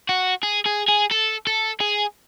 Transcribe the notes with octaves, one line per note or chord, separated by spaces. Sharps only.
F#4
G#4
G#4
G#4
A4
A4
G#4